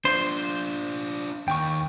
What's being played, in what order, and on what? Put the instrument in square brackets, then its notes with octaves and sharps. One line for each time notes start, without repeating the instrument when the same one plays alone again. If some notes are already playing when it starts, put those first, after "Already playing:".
[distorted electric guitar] D4 F4 [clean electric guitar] C5
[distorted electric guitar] D#2 [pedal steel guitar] G5 C#6